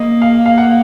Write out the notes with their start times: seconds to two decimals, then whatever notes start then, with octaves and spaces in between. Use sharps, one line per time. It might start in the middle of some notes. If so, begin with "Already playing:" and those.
Already playing: A#3 D#5
0.22 F5
0.46 F5
0.58 F#5